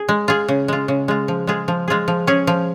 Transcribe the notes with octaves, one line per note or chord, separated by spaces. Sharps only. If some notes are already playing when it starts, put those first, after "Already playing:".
Already playing: G#4
G#3
F4 G#4
C#3
G#3 F4
C#3
G#3 F4
F3
G#3 F4 G#4
F3
G#3 F4 G#4
F3
C#4 G#4
F3